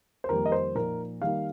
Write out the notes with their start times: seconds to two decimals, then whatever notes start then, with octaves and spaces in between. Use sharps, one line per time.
0.24 C5
0.29 F2 D#3 G3 A#3 A#4
0.46 D#5
0.52 C5
0.75 A#2 F3 D#4 A#4
1.21 D#3 G3 A#3 D#4 F5